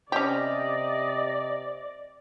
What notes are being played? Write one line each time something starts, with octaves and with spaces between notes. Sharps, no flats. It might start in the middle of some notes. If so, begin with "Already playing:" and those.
C3 C#4 G4 D5 D#5